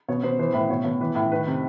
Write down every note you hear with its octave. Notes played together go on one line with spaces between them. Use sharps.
B2 C#5
B2 C5
E3 C5
A2 B4
B2 C#5
B2 C#5
E3 B4
A2
D#3 B4
C3